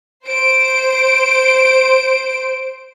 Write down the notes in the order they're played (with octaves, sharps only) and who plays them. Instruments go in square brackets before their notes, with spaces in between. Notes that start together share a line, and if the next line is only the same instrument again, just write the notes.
[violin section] C5 D7